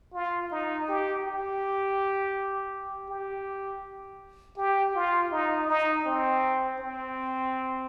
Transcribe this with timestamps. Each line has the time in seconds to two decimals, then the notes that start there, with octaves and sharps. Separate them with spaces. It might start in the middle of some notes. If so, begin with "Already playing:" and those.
0.14 F4
0.51 D#4
0.88 G4
1.25 G4
3.09 G4
4.57 G4
4.95 F4
5.31 D#4
5.68 D#4
6.05 C4
6.80 C4